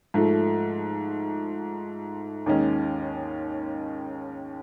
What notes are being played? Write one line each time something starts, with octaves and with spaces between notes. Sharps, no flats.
G#2 F3 A3
D#2 D#3 G#3 C#4